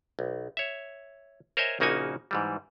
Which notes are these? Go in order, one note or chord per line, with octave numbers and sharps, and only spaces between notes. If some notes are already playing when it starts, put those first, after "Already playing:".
B1
C#5 E5
A#4 C5 C#5 D#5 E5 G#5
A#1 C#3 A#3 D#4 F#4 G#5
G#2 E3 G3